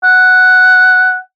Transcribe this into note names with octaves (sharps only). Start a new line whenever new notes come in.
F#5